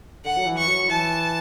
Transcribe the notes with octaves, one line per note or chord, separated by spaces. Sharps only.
D3 F#5
F#3
E3
C#6
F#3
E3 A5